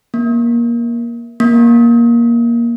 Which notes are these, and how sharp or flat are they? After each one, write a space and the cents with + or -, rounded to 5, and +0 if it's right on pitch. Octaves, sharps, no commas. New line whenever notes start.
A#3 +20
A#3 +15